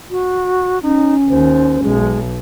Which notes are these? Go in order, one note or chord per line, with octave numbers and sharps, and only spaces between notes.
F#4
C#4 D#4
D#2 C5
B1 G#3